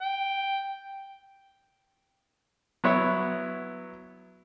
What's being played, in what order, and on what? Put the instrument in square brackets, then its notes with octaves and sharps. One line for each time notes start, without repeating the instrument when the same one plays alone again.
[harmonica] G5
[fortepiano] F#3 B3 E4 C#5